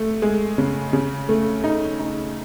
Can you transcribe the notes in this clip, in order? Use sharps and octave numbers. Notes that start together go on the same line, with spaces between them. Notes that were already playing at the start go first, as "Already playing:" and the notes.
Already playing: A3
G#3
C#3
C#3
A3
D#4
D#4